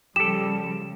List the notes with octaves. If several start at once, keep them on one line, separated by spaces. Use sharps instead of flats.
C#3 F3 G3 G4 A4 E7